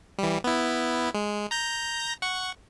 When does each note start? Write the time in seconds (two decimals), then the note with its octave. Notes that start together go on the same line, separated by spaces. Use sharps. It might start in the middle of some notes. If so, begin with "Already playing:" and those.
0.18 E3 G3
0.44 B3 E4
1.14 G#3
1.51 A#5 G6 A#6
2.22 F#5 C#6